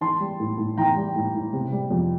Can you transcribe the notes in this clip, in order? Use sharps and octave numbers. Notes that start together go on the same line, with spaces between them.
E3 A5 C6
G3
A2
A2
E3 G5 A#5
G3
A2
A2
C3
G3
F2